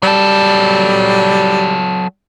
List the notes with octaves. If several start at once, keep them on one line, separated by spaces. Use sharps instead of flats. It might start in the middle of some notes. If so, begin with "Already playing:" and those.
F#3 G3 A4